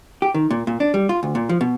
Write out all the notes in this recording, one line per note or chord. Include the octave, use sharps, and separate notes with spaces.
G4
D#3
A#2
A#2
D4
G3
F4
D2
A#2
F3
B2